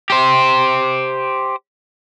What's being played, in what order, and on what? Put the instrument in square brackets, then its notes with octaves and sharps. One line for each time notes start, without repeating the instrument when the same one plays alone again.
[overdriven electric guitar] G4 C5